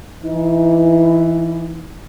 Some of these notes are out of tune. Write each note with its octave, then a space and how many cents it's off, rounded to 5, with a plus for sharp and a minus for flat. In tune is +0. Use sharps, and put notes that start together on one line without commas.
E3 +15 D#4 +35